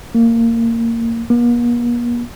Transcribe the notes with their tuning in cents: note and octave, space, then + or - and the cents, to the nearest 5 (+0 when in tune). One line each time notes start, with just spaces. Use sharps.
A#3 -20
A#3 +45